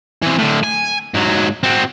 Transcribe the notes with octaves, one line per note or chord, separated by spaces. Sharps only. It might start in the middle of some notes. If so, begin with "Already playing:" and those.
E3 C4
A2 D3
G#5
G#2 F#3
C4 F#4